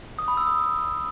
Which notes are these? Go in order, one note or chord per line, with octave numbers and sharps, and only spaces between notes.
D#6
B5
E6
D#6